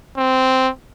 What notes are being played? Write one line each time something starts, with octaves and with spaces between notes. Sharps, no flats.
C4